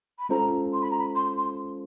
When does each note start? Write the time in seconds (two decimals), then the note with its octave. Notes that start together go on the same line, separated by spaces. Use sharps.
0.19 B5
0.29 G#3 C#4 F4 A4 C5 A#5
0.73 C6
0.81 B5
0.91 A#5
0.99 B5
1.15 C6
1.37 C6